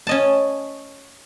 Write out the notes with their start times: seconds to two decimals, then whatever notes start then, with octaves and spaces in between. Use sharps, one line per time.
0.07 C#4 D#5 A5